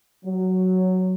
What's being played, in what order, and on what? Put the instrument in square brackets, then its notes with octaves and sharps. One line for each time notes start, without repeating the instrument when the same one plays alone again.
[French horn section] F#3